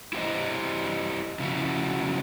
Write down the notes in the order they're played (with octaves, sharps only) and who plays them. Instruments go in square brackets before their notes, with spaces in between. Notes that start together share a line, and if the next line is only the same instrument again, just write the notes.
[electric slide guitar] E4 G4 C5 D#5
C#3 F3 F#3 E4 F#4